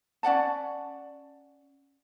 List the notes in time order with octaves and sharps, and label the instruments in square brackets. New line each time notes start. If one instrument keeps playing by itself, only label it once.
[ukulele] C#4 D5 F#5 A5